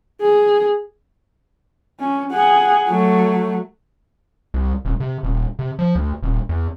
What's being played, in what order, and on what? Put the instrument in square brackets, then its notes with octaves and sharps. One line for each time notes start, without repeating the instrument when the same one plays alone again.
[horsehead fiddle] G#4
C#4
G#4 F#5
F#3 A3
[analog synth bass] C2
D#1
C3
D#1
C3
F3
D2
D#1
E2